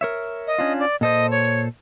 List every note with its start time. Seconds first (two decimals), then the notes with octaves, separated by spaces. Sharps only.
0.01 A#4 C#5 E5
0.47 D#5
0.59 C#4 D4 F4
0.79 D5
1.01 A#2 A4 C5 D#5
1.31 C#5